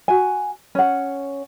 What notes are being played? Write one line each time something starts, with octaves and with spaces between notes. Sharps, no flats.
F#4 G#5
C#4 F#5